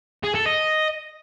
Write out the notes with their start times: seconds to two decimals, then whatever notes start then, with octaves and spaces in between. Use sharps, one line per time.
0.24 G#4
0.35 A4
0.46 D#5